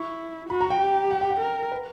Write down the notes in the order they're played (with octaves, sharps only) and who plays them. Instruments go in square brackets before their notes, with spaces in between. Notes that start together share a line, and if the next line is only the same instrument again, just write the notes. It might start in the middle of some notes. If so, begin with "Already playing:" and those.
Already playing: [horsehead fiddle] E4 [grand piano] C#6
[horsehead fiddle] F#4 [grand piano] B5
[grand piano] A#5
G5
[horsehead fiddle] G4
[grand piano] F#5
G5
F#5
[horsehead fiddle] A#4
[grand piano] B4